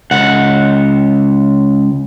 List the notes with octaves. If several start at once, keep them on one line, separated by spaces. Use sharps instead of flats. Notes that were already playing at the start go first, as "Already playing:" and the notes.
C#2 F#5